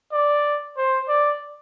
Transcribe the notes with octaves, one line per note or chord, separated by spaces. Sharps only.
D5
C5
D5